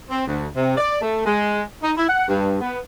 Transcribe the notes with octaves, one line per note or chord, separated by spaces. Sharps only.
C4
D2
C3
D5
A3
G#3
D#4
E4
F#5
G2
B3